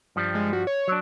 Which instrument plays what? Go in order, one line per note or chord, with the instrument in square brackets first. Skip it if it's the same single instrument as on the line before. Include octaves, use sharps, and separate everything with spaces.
[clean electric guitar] G2 F3 G3
[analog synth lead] G#3
F#4
C#5
[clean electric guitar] F#3 D4